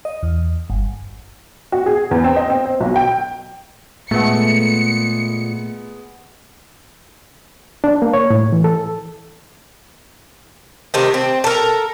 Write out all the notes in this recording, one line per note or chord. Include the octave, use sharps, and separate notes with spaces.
D#5
E2
G1
F#4
G#4
E2
C4
D#5
C4
C5
B1
G5
A#2 G#3 A3 B3 F#5 C#7
D4
A#3
C#5
A2
E3
A4
C3 D#3 A3
C4
A4 A#4